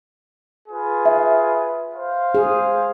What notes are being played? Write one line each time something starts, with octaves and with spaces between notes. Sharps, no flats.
F4 G#4 B4
E5
C5 F5
G#4